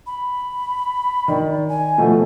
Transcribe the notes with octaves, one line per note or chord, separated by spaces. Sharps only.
B5
D#3 D5
G#5
B2 F3 A3